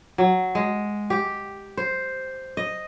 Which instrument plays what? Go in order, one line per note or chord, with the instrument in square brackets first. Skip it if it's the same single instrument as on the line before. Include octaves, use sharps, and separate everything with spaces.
[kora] F#3
G#3
G4
C5
D#5